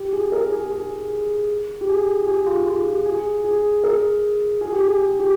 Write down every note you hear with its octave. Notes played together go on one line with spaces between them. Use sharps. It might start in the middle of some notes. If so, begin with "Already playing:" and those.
Already playing: G4
G#4
A#4
G#4
G#4
G4
G#4
G4
G#4
F4
F4
G4
G#4
G#4
A#4
G#4
G4
G#4
G#4
G4